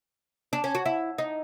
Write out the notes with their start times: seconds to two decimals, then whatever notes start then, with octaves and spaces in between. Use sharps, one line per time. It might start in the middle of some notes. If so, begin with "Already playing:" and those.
0.53 D4
0.64 C#4
0.75 F#4
0.86 E4
1.18 D#4